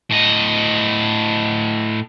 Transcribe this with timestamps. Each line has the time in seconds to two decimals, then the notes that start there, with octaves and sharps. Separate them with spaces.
0.11 A2 D#5